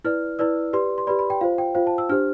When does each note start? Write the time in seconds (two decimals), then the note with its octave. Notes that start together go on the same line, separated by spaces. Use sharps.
0.05 E4 B4 D5 F6
0.39 E4 B4 D5 E6
0.73 G4 B4 D5 C6
0.98 C6
1.07 G4 B4 D5 B5
1.19 B5
1.30 G5
1.41 F4 C5 F5
1.58 G5
1.75 F4 C5 F5
1.87 A5
1.98 E6
2.09 D4 G4 C5 F6